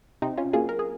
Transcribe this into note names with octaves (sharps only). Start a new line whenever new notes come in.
C3 C4 D#4
C#4 F4
F#3 A#3 F4 G#4
A#4
G#4